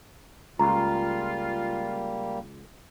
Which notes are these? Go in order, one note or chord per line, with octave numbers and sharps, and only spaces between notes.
C#2 G3 A#3 F4 A#5